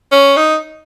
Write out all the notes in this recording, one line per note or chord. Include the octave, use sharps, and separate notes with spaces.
C#4
D#4